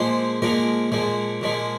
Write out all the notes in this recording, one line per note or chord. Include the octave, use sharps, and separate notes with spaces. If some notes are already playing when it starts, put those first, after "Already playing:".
Already playing: A#2 F3 G#3 C5
A#2 F3 G#3 A#4
A#2 F3 G#3
A#2 F3 G#3